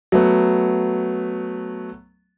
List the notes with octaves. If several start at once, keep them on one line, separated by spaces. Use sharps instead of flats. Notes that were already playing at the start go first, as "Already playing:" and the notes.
F#3 A3 B3